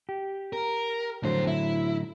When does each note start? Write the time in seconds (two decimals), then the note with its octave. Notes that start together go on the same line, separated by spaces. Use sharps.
0.09 G4
0.53 A#4
1.23 F2 A2 D3 F#3 C5
1.47 E4